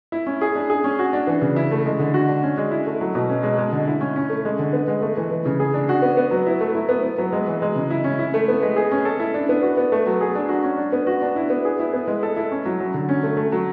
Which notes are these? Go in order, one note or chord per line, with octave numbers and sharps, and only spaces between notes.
E4
C#4
G#4
D4
G#4
C#4
F#4
D4
E3
C#3
E4
A3
G#3
D3
F#4
D4
C#4
G#3
E4
A3
F#3
B2
C#4
G#3
G#3
D3
E4
C#4
C#4
A3
G#3
D3
B3
G#3
A3
E3
E3
C#3
G#4
D4
F#4
B3
B3
F#3
E4
A3
E4
B3
B3
F#3
G#3
E3
G#3
C#3
E4
C#4
E4
A3
B3
G#3
G#4
C#4
A4
E4
D4
B3
F#4
B3
A3
F#3
G#4
D4
F#4
C#4
D4
B3
F#4
D4
E4
B3
G#4
E4
B3
G#3
A4
E4
C#4
F#3
F#3
D3
C#4
A3
A3
F#3